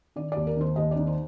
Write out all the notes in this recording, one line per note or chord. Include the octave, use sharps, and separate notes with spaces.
D#3 D5
D#2 D5
A#4
D#3 C5
D#2 D#5
D5
D#3
C5